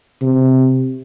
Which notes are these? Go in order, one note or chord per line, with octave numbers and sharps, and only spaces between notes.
C3